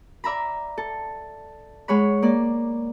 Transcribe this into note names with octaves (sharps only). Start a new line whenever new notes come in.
D5 E5 A#5 B5
A4
G#3 G#4 C#5 F#5 B5
A#3 D5